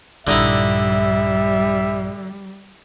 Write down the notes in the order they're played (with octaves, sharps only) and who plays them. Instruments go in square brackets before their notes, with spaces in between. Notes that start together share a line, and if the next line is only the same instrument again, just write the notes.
[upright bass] A#1 G2 [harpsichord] D3 D#4 E4 [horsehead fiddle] G3 [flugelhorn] E5